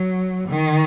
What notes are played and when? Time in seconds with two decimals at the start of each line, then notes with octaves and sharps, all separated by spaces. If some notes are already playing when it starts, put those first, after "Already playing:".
Already playing: F#3
0.49 D#3